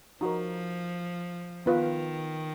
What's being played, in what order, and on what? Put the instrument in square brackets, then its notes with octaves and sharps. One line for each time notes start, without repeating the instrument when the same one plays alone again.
[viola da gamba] F3 [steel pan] D#4 F#4 A#4
[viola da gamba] D#3 [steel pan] B3 F4 B4 F5